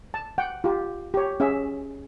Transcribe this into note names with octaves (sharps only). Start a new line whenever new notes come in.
A5
F#5 G5
F4 G4
G4 C#5
C#4 G#4 E5